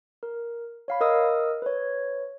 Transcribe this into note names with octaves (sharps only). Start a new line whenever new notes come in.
A#4
C#5 F5 B5
A#4 D#5 D#6 E6
B4 C#5